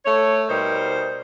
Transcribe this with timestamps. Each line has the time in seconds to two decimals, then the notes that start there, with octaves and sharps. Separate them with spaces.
0.05 A3 C#5
0.49 B2 G3 D#4 A#4 C5